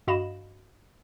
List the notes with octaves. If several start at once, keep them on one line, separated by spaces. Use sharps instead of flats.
G2 F#4 D#5 F5 B5 E7